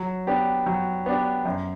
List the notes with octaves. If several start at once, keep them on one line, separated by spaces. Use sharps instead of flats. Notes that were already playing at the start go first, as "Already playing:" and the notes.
Already playing: F#3
B3 D4 G4
F#3
B3 D4 G4
F#2